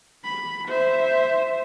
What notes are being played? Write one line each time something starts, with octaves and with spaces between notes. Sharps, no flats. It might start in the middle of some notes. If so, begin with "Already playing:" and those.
B5
C5 E5